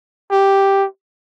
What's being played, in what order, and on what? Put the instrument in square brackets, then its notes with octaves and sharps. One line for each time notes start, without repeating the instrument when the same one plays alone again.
[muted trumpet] G4